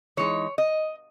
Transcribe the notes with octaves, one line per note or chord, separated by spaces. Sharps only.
E3 G#3 D#4 C#5
D#5